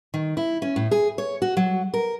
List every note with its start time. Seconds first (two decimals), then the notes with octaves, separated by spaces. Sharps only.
0.14 D#3
0.37 E4
0.62 C#4
0.76 A2
0.91 G#4
1.18 C#5
1.42 F#4
1.57 F#3
1.94 A#4